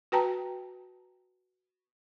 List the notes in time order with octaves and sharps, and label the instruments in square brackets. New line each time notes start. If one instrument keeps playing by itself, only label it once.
[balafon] F#4 B4 G5 A5 A#5